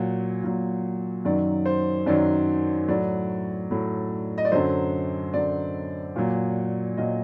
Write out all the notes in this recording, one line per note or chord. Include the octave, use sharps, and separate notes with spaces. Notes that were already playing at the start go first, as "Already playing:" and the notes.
Already playing: A#2 F#3
A#2 F#3
F#2 D#3 F#3 D5
C5
F#2 D#3 F#3 D5
A2 F#3 D5
A2 F#3
D#5
D5
F#2 D3 F#3 C5
F#2 D3 F#3 D5
A#2 F#3
A#2 F#3 D#5